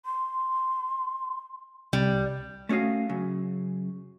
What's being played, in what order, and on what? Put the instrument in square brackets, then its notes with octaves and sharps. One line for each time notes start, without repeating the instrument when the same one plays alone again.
[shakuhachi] C6
[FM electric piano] C2 [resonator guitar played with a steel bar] G3
[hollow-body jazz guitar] A3 C#4 F#4 D#5 F5
F#2 C#3